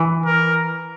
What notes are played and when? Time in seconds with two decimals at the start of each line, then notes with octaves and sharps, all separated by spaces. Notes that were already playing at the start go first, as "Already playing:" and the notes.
Already playing: E3
0.26 A#4